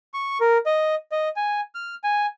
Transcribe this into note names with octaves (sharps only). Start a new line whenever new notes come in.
C#6
A#4
D#5
D#5
G#5
F6
G#5